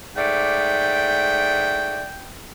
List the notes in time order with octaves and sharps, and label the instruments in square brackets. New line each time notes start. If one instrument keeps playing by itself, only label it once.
[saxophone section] G#2 A3 D5 [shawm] G5